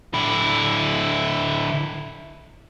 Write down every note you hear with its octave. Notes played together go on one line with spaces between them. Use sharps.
D3 E4